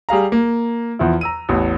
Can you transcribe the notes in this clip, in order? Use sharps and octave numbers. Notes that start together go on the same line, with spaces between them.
G3 G#4 F5 A#5
A#3
E2 F3 E4
A#5 E6 D#7
A1 E2